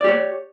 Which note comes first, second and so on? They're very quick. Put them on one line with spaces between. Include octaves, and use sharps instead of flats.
D5 G4 C#5